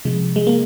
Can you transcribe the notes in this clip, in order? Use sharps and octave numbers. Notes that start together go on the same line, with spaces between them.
C3 F3 G#3
G#3
A#3